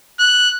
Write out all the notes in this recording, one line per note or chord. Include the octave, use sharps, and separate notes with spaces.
F#6